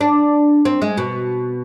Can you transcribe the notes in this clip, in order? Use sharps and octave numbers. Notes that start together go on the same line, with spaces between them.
D4
C4
G#3
B2